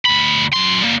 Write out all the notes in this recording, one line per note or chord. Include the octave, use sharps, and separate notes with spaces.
D2 B5
F#2 C6
G3 A#3